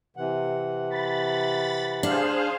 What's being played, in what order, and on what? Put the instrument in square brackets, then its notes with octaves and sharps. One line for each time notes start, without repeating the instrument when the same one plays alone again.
[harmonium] C3 E3 F#5
[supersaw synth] B5 A6
[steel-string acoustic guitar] D4 [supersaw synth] G#4 C5 F5